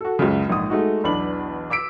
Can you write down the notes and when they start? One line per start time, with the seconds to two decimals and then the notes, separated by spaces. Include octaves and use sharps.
0.01 F#4 A4
0.19 C#2 F#2 C#3
0.49 A#1 G#2 D#6
0.70 G#3 A3 D#4 F#4
1.04 B1 E2 D4 B5 F#7
1.70 D6 E6 B6 D7